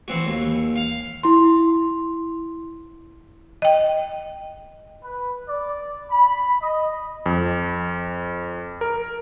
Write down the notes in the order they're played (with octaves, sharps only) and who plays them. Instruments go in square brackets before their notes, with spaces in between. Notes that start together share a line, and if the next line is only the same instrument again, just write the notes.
[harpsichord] E3 C4 F#4
D#2
F5
[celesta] E4 C6
[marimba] D#5 G5
[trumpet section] B4
D5
B5
D#5
[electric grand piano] F2
A#4